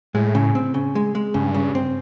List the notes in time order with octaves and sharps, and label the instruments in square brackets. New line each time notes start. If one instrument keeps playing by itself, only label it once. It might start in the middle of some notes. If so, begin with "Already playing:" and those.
[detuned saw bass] A2 [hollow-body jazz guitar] G#3
[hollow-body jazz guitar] C#3
C4
C#3
G#3
G#3
[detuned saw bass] G2 [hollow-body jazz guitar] C#3
[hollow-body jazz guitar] C#3
C4